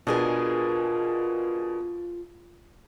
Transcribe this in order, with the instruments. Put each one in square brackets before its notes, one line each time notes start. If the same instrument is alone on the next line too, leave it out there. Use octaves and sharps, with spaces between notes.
[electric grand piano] B2 D4 G#4 [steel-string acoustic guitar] B3 A#4 D#5 [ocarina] F4